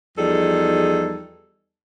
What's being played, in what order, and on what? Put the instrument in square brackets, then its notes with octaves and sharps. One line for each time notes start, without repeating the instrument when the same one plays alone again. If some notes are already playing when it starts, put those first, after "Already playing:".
[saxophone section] E2 F3 G3 D#4 G#4 A4